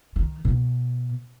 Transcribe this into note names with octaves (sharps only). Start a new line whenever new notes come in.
D#3
B2